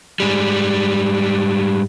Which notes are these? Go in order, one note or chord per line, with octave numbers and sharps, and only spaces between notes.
G#2 G3